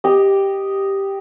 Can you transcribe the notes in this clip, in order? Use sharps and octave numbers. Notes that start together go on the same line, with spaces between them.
G4 D#5